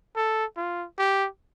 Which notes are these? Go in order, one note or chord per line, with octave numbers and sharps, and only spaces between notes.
A4
F4
G4